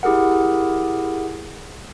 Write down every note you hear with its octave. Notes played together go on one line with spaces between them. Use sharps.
E4 G4 G#4 A#4 F#5